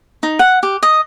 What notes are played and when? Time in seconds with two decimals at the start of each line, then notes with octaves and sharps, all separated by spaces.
0.23 D#4
0.39 F#5
0.63 G4
0.83 D#5